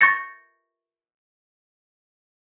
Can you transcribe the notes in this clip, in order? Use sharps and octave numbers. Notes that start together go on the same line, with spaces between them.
C#6 G6 A6 A#6 C#7